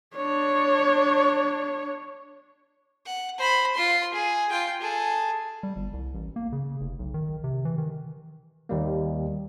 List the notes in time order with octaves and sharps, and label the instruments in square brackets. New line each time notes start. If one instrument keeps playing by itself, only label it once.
[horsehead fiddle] D4 C#5
[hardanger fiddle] F#5
C5 B5
F4 C6
G#4
F4 G5
G#4 A4
[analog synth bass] G3
G1
C2
A1
A#3
C#3
F1
B1
D#3
C3
E3
D#3
[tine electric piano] D#2 G3 A#3